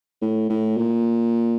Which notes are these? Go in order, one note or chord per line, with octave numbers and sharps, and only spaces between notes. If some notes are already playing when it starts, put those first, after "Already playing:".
A2
A2
A#2